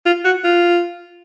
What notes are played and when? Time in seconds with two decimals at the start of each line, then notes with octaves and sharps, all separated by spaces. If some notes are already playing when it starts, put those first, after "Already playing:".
0.06 F4
0.25 F#4
0.44 F4